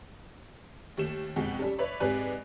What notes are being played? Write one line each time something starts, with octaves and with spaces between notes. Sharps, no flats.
D#2 A3 E7
F#1 F2 B2 G#3 F#5 G5
G3 C#4 D4 A4
B4 C#5 D5 E5 B5
G#2 C3 B4 D5 G#5 F#6